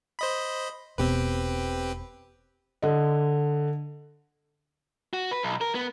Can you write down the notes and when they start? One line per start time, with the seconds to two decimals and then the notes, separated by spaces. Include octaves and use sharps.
0.19 C5 D#5 B5
0.98 E1 B2 C4 G4 B4
2.82 D3 D#5
5.13 F#4
5.31 B4
5.43 B1
5.61 A#4
5.75 B3